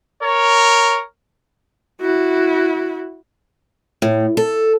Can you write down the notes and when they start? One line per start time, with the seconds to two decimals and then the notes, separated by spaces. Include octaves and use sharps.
0.22 A#4 C#5
2.01 E4 F#4
4.02 A2
4.37 A4